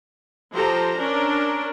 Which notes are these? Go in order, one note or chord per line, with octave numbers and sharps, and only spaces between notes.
F3 G4 A4 C5 A#5
C#4 D4 A#4